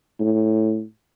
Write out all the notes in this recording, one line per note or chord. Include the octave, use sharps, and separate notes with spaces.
A2